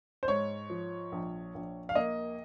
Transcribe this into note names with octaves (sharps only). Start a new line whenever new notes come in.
C5
G#2 C#5
F3
A#1
A#1
F5
A#3 D#5